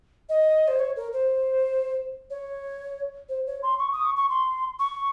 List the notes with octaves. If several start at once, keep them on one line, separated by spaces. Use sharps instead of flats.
D#5
C5
C#5
A#4
C5
C#5
C5
C#5
C6
C#6
D#6
C#6
C#6
C6
C#6